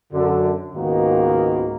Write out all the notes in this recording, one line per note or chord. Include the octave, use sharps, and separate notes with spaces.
F#2 D3
C#2 G#2 D#3 A#3 B3 F#4